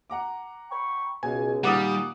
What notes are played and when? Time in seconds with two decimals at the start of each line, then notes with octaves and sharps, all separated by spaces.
0.10 F#5 A#5 D6
0.70 G5 B5 C#6
1.23 C#2 B2 G#5
1.64 A#2 D#3 G3 A#3 F#5 D6 D#6